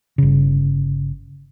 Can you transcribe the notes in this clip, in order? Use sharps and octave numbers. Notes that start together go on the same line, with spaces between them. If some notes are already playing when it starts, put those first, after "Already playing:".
G1 C#3